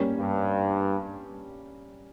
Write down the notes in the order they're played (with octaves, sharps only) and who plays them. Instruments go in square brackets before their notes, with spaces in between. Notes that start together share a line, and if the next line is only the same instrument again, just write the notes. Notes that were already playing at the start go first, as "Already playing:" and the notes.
Already playing: [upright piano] G3 A#3 C#4
[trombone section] G2